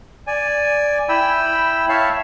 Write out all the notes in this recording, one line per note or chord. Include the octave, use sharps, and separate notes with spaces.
D5 G#5
E4 G5 B5 E6
C#5 E5 F5 A5